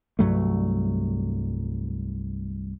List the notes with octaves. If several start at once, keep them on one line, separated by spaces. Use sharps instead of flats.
C2 G2 F#3 A3